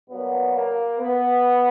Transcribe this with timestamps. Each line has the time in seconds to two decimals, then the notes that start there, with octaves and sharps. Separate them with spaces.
0.10 G2 F#3 A#3 B3
0.54 A#3
0.99 B3